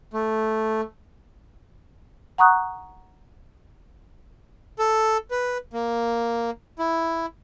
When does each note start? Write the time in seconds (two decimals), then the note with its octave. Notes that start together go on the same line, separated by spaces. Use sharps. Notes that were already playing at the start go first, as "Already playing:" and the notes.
0.13 A3
2.38 F#5 A#5 C#6 D#6 F#6
4.79 A4
5.31 B4
5.73 A#3
6.79 E4